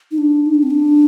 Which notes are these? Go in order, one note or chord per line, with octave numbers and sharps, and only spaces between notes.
D#4
D4
D#4
D4
C4
D4